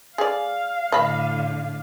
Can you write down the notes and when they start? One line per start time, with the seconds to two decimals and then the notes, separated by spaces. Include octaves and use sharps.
0.18 G#4 D5 F5
0.92 A2 D3 D#5 B5